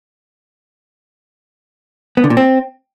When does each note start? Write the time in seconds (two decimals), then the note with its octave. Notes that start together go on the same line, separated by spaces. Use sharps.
2.17 B3
2.24 D3
2.30 A#2
2.37 C4